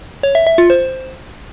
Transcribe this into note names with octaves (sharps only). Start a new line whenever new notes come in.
C#5
E5
E5
F4
C5